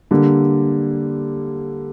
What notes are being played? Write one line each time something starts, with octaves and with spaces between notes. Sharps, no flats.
D3 G3 A#3